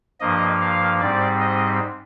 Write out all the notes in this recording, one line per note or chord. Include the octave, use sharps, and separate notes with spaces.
G2 F3 A#3 D#5
F5
G#2 G3 C4 D5
D#5